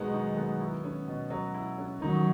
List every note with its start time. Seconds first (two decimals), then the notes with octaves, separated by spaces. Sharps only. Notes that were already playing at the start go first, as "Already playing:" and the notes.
Already playing: B2 D#3 F#3 G#3 B3 D#4
0.13 D#4
0.37 B3
0.61 E4
0.84 C#4
1.08 B2
1.30 F#3
1.54 E4
1.78 C#4
2.01 D#3 F#3 D#4